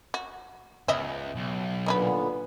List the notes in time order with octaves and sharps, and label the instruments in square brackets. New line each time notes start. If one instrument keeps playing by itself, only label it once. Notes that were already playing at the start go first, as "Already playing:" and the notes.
[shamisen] F#4
[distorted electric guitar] C#2 [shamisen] B3 D#5 E5
[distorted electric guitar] B1
[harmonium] A#2 D3 B3 [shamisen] D#3 D#4 B4